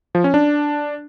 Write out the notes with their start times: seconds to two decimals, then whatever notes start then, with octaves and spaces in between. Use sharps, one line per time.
0.15 F3
0.24 C#4
0.34 D4